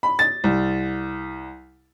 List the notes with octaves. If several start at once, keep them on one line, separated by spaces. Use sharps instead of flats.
B5
A6
C2